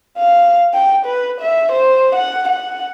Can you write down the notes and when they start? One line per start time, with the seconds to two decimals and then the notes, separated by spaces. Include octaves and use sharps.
0.18 F5
0.74 G5
1.06 B4
1.40 E5
1.72 C5
2.16 F#5
2.49 F#5